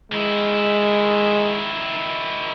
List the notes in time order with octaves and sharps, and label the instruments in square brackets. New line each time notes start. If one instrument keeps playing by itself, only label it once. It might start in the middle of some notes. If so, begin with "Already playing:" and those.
[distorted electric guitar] D#3 E4 [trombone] G#3